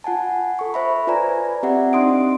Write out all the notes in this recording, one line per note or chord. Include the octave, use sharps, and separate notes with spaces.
F4 F#5 G#5 A5
A4 C#6
C5 E5 B5
F4 B4 D5 G#5 A#5
C4 G4 D5 E5 F#5
C4 D4 D#4 C6 D#6 D7